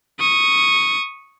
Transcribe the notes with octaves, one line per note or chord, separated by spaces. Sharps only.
C#6 D#6